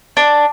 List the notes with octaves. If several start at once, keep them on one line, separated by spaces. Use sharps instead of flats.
D4